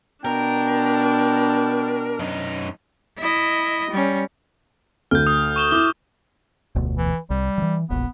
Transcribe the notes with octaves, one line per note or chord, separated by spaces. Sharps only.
B2 D4 A#4 G5
F#2 D#4
E4 D#5
G3 C#4
D2 F6 G6
D#6
C#6 E7 G7
E4 D6 G7
F1 D2 B2
E3
C2 G3
E3 F3
E1 A#1 B3